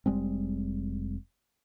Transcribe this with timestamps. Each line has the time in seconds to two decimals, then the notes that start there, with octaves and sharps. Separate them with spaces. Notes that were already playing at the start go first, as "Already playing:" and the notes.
0.06 F1 G3 G#3 C4